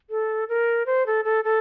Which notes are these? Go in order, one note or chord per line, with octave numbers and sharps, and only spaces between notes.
A4
A#4
C5
A4
A4
A4